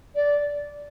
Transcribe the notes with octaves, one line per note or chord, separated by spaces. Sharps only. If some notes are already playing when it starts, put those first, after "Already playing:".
D5